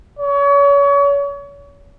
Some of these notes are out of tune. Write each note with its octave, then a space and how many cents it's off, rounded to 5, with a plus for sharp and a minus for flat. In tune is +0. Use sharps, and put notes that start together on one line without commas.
C#5 +35